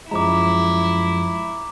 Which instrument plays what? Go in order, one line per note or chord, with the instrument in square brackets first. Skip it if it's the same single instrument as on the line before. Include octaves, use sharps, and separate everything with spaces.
[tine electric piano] F#2 F3 G#3 [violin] E4 [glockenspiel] A#5 D6